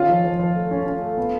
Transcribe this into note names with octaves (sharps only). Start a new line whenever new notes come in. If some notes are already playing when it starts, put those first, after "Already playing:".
Already playing: D#3 C#4 F4 F5
F3
F3
F3
A3
C#4
C#4
A3
B3